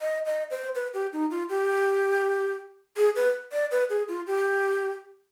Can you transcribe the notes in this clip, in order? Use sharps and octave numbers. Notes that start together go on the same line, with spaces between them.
D#5
D#5
C5
B4
G4
D#4
F4
G4
G#4
B4
D5
B4
G#4
F4
G4